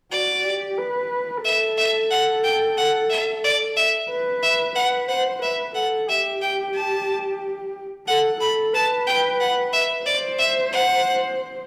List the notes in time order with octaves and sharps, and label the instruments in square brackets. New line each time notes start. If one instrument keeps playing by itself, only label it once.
[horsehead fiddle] F#4 [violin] D5
[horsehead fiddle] G4
B4
[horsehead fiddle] A4 [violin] E5
[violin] E5
F#5
G5
F#5
E5
D5
E5
[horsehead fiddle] B4
[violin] E5
[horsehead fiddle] B4 [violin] F#5
[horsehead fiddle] C5 [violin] F#5
[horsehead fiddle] B4 [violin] E5
[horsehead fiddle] A4 [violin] F#5
[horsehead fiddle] G4 [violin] E5
[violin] G5
A5
[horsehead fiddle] A4 [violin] F#5
[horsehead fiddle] A4 [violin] B5
[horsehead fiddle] B4 [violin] A5
[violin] G5
F#5
E5
[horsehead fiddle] C5 [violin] D5
[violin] E5
F#5